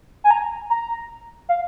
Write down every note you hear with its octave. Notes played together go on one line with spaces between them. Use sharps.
G#5
A#5
A#5
F5